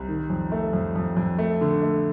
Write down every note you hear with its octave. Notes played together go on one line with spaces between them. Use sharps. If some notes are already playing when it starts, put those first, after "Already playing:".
Already playing: C2
D#3
F2
A3
F2
F2
F2
A3
D3
A3